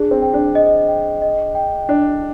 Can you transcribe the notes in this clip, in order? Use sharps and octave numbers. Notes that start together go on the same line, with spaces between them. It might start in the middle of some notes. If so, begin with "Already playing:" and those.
Already playing: D4 G#4
C4
G5
D4
D#5
G5
D#5
G5
D4 G5